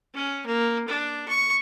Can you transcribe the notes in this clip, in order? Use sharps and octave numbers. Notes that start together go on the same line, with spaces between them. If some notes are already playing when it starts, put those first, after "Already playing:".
C#4
A#3
D4
C#6